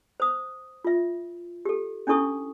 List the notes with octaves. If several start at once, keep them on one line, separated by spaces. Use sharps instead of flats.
C5 D#6
F4 E5
G4 A4
C#4 D4 E4 A4 C#6 D#6